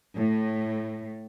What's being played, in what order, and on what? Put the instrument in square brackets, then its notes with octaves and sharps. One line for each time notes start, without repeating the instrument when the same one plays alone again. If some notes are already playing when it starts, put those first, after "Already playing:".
[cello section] A2